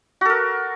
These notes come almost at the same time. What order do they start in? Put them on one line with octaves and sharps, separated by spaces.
F#4 A4 A#4